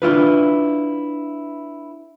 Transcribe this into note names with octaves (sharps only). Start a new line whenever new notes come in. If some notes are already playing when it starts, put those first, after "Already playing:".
D4 E4 F4 B4